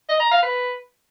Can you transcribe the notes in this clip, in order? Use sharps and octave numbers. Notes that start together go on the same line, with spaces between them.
D#5
A#5
F5
B4